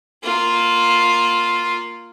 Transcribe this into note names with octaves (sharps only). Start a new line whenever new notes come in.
A#3 F4